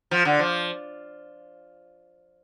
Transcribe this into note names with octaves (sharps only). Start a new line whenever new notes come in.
F3
D3
F3